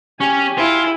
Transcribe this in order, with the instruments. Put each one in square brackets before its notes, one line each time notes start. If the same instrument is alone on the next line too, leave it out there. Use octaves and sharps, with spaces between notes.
[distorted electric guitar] C#4 [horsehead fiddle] G4 G#5
[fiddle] E4 [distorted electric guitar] F4